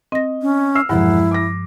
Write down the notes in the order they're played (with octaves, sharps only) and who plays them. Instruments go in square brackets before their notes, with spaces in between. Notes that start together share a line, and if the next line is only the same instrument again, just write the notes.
[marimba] C4 A#6 [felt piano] D#5
[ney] C#4
[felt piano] E6 F6 C7
[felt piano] E1 F#5 [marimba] G2 F3 [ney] E4
[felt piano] D6 A#6